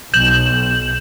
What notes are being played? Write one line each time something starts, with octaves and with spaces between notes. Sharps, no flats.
B1 G6 E7 F#7